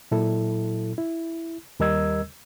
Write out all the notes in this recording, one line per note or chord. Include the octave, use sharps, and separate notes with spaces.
A#2 F#3 E4 A4
E4
D#2 G3 A#4 D#5 E6 G#6